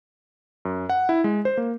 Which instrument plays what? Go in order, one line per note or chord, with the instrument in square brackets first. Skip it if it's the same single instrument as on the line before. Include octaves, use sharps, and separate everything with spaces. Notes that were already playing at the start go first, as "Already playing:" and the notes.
[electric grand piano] F#2
F#5
E4
G#3
C5
A#3